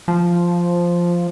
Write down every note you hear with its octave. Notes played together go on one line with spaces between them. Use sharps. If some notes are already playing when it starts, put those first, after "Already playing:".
F3